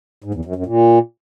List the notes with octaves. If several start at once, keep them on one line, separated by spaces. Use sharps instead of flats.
G#2
E2
F#2
F#2
A#2